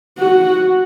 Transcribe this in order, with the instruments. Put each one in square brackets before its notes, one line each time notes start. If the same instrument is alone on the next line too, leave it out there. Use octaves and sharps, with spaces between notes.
[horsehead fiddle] F#4